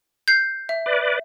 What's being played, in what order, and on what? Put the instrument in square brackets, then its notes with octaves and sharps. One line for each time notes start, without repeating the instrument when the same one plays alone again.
[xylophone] G6 C7
E5
[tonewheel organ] B4 D5